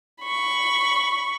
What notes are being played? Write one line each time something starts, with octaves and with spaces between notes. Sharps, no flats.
B5 C#6